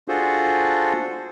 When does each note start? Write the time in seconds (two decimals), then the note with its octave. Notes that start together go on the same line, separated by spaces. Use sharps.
0.08 D4 F4 F#4 G#4 A4 C5